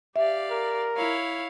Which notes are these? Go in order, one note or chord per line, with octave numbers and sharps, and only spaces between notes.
G4 D5 E5 F5
A#4
E4 C#5 F5